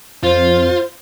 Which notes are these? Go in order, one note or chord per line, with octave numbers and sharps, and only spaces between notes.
F2 F4 C5